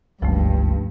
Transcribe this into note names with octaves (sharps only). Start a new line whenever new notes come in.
F#1 C#2 G2 F3 A3